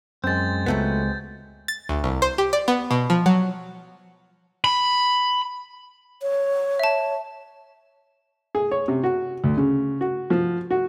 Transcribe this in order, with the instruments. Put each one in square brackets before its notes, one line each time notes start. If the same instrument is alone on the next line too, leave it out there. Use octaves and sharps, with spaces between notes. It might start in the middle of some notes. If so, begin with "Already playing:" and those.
[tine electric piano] F#2 [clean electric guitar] G#3 C4 [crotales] G6 A6
[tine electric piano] C#2 [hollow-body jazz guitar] F#3 A3 B3
[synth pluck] A6
D2
C2
C5
G4
D5
B3
B2
F3
F#3
[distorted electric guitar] B5
[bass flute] C#5
[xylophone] E5 A5
[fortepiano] G#4
C#5
C3
F#4
D2
C#3
F#4
F3
F#4